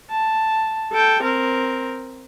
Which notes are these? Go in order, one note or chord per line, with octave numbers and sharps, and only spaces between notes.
A5
A4 G5
C4 A#4